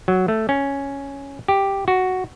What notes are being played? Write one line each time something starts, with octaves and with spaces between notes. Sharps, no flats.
F#3
A3
C#4
G4
F#4